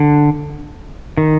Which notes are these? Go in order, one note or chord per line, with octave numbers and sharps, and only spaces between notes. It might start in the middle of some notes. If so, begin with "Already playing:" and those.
Already playing: D3
D#3